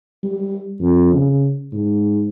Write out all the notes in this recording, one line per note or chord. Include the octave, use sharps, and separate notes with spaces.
G3
F2
C#3
G#2